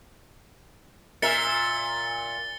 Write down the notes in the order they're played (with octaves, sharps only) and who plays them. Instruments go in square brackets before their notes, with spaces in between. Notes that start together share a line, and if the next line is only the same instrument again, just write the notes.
[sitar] A#2 A#4 E5 [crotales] A6 C#7 G7